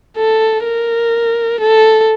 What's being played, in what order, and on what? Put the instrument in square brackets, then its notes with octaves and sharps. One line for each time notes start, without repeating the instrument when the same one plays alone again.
[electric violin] A4
A#4
A4